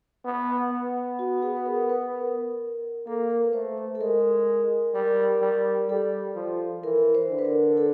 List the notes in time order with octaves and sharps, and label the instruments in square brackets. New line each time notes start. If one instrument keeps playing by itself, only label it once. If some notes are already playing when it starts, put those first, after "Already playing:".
[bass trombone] B3
B3
[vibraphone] F#4
G#4
B4
A#4
B4
A#4
[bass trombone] A#3 [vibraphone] A4
[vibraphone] A#4
B4
[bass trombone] A3 [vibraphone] C5
[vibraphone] C5
A4
[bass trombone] G#3 [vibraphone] A#4
[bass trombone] G3 [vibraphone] A#4
[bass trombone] G3
[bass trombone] G3 [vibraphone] A4
[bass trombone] F3
[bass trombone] E3 [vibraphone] A#4
[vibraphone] C5
[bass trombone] D3
[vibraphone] B4
A#4
A4